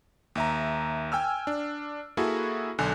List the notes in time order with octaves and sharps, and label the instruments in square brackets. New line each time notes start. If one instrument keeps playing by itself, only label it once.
[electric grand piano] D#2 E5 A#5
G5 G#5 E6 F6
D4
A#3 E4 F#4 G#4 A4
B1 D3 G#5 F#6